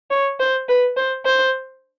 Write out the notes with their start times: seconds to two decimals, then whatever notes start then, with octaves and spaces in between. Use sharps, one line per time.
0.11 C#5
0.40 C5
0.69 B4
0.96 C5
1.26 C5